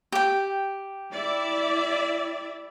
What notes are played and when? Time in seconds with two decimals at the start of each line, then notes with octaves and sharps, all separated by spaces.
0.12 G4 G5
1.12 E4 D5 E5